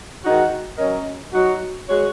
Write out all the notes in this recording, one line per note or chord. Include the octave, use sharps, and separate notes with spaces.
D#3 G#3 D#4 F#4
F#3 C#4 A#4 D#5
F#3 D#4 F#4
G#3 F#4 C#5